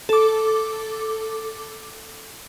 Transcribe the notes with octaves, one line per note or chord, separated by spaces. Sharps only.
A4 D6